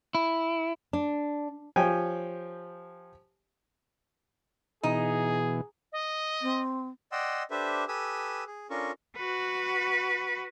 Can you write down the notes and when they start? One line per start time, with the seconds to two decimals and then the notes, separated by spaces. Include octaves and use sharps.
0.15 E4
0.93 D4
1.76 F3 G4 C#5 G5 G#5
4.83 B2 E3 D#4 G#4
5.92 D#5
6.42 C4
7.12 D5 D#5 F#5 G5 C6 E6
7.51 D4 G4 A4 B4 C5 E5
7.88 G4 A4 B4 G#5 D#6 E6
8.47 G#4
8.70 C#4 D4 F4 A4 A#4 C#6
9.16 F#4 B4